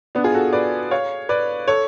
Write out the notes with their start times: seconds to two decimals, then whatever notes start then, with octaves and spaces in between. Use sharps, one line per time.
0.15 B3 D4
0.24 F4 G#4
0.34 F#4 A4
0.53 B4 D5
0.91 C#5 F5
1.29 B4 D5
1.68 A4 C#5